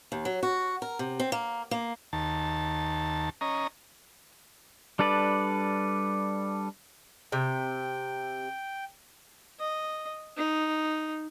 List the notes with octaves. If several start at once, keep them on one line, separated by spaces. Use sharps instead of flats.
D#2
F#3
F#4
A#4
C3
C4
A#3
A#3
D#2 A5
C#4 D#5 A#5
G3 D4 A4 B4 D5
C3 G5
D#5
D#4